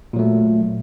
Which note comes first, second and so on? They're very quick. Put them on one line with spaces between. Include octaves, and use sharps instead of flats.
A#2 F#3 A3